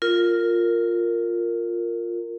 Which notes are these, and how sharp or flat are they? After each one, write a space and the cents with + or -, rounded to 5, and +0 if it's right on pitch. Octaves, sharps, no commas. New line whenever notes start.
F4 +0 A#4 -15